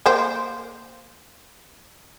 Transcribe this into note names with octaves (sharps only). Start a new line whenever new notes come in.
A#3 C5 G5